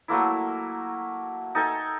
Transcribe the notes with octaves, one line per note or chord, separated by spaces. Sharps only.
F#3 A3 A#3 E4
D#4 A4 G5 G#5